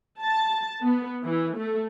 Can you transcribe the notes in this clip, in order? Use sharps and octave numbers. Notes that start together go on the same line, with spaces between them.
A5
B3
E3
A3